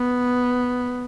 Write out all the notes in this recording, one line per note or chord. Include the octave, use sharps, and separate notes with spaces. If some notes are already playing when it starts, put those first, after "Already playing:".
Already playing: B3